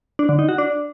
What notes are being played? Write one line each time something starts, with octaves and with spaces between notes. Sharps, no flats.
D4
D3
D#4
F#4
D4